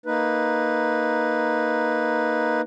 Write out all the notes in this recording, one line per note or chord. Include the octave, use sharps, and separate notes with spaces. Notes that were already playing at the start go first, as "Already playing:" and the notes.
A#3 D#4 B4